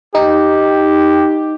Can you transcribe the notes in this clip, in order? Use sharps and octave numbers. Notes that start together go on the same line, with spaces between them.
D#4 G4